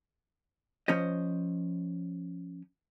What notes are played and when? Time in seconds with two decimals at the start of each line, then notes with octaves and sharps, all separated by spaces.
0.88 F3 C#4 C5 D#5